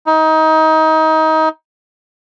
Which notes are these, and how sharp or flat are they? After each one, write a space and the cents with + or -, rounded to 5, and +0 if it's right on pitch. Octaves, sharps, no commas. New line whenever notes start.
D#4 +25